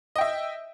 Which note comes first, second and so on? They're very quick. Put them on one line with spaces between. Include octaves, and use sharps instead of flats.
D#5 G5 E5